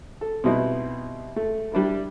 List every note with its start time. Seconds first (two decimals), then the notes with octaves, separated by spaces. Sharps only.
0.21 A4
0.44 B2 G3 B3 C4 D#4 E4
1.36 A3
1.72 G3 D4 E4 A#4